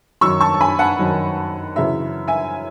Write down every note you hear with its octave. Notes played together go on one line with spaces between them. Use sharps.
F#2 D#3 F#3 C#6 E6
A5 C#6
A5
G#5 B5
F#5 A5
F#2 D#3 F#3
F#2 C#3 E3 E5
E5 G#5